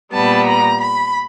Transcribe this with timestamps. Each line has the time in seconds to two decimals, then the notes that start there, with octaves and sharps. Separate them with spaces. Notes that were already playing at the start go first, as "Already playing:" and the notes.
0.12 A#2 G3 B3 A5
0.47 A#5
0.82 B5